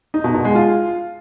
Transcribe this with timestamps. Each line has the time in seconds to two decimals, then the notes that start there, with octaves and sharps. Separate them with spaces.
0.14 D#4
0.24 B2
0.35 B2
0.45 G#3
0.55 F4